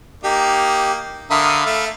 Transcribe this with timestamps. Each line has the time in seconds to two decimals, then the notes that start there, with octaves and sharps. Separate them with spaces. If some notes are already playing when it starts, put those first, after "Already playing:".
0.24 A#3 D#4 G4
1.31 D3 A#4 E5 F5 B5 D#6
1.66 A3